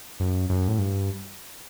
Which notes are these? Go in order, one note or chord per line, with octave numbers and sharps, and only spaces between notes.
F#2
F#2
A2
G2